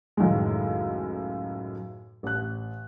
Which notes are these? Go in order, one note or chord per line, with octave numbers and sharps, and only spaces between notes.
C#2 F#2 A2 D#3 G#3
A1 F#6